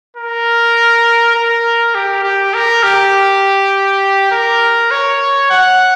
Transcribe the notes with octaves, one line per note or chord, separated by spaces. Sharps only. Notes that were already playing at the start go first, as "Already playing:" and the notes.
A#4
A#4
G4
G4
A#4
G4
A#4
C#5
F#5